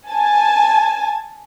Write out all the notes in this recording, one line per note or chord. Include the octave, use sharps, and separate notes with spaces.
G#5 A5